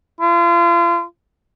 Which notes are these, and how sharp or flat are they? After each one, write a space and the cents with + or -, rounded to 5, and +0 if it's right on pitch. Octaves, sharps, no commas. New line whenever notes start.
F4 -35